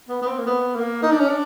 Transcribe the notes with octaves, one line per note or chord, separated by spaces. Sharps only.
B3
B3
C4
A#3
B3
A#3
D#4
D4
C#4
D4